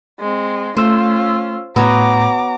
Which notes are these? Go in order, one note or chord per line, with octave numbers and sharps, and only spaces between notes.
G#3 C4
A3 C#4 F4 C5 E6
A2 B3 F#4 C#5 A#5 D6